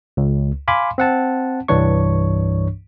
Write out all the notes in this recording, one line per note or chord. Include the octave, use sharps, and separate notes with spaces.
C#2
F5 G#5 B5 C6 D6
C4 F#5 A5
C2 G2 E3 D4 C#5 C#6